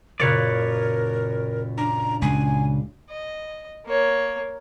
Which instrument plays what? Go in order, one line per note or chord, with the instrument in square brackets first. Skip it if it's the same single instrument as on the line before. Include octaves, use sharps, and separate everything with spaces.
[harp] F#1 A#2 G#6 [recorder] A#4 [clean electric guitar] B4 C#5 D5
[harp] D4 [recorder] A#5
[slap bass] C#2 [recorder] G#5
[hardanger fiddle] D#5
A#3 C#5